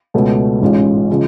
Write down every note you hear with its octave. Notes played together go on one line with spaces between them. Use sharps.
C#2 B2 A3 C#4
A1 G#2 G#3 C#4 F4
C#3 F3 G#3